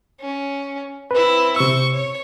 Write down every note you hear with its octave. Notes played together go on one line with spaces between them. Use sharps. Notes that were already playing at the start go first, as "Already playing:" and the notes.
C#4
C4 E4 B4
C3 C5 C#6 E6
C#5